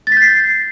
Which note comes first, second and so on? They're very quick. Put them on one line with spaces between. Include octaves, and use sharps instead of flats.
A6 B6 G6 C7